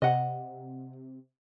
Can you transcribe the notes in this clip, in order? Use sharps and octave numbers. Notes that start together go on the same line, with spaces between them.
C3 D#5 F#5